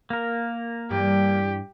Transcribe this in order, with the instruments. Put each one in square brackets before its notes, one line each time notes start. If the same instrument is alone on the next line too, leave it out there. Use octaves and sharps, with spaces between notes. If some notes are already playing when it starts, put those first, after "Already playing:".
[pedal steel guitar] A#3 A#4
[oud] G2 E3 [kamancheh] G4